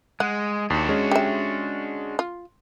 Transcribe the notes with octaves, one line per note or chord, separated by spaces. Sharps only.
G#3 F#5
D#2 D4 F#4
G#3 C#4
G4 E5
F4